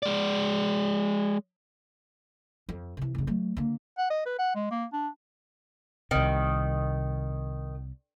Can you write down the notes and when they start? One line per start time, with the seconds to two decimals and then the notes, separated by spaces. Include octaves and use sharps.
0.03 G#3 D5
2.69 F2
2.97 C3 E3
3.15 F#1 C#3
3.27 F#3 A3
3.57 D3 A#3
3.98 F#5
4.10 D#5
4.26 B4
4.39 F#5
4.55 G#3
4.71 A#3
4.93 D4
6.11 C2 C3 D#3